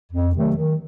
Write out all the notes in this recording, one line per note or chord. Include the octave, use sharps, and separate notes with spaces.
F2
C3 D#3 F#3 A3
D#3